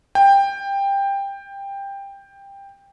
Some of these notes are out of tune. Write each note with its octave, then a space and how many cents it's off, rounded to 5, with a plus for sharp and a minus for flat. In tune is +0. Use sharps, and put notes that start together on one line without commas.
G5 +15